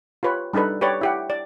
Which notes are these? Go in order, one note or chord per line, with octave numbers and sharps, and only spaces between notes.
F4 G4 B4 C#5
G3 D4 D#4 A4 B4
G4 B4 C#5 D5
E4 G4 F#5
D5